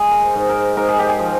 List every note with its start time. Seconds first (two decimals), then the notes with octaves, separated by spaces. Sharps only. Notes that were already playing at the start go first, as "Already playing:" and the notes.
Already playing: G#3 G#4
0.11 A#4
0.21 C5
0.36 G#2
0.49 A#4
0.77 G#2 A#4
0.88 G#4
0.99 G4
1.09 G#4
1.19 F3